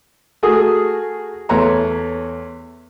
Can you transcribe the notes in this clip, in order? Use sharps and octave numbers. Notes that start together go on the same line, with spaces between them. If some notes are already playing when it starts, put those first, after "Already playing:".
A3 F#4 G#4 A#4
E2 A3 B4 C#5 A#5 C6